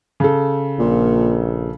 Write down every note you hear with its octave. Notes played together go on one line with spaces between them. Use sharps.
C#3 A4
A#1 A#2